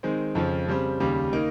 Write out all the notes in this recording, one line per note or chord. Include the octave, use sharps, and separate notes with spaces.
D#3 G#3 C4
F2 C#3 F3
C#3 G3 C4
D#2 C#3 G3
D#3 A#3 D#4